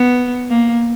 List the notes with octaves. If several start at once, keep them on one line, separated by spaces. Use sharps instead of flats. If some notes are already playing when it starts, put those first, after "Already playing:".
Already playing: B3
A#3